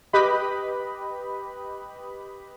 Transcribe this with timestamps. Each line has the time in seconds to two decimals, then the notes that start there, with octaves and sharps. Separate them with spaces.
0.13 G4 B4 D#5 B5